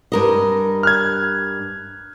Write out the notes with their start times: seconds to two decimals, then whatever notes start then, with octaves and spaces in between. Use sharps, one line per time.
0.12 G2 A#4 D#5
0.83 F6 F#6 G#6